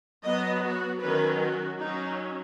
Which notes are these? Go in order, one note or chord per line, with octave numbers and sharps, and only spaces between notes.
F#3 B3 D#5
F#4
D#3 F#3 C#4 B4
F#4
F#3 C#4 D#4